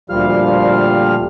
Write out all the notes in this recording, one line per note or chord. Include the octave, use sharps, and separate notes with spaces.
D2 A#2 F3 G3 F5 F6